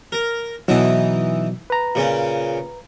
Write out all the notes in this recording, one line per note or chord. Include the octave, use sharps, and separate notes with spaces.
A#4
B2 E3 F#3 D#4 E4
B4 A#5
A#2 C#3 C#4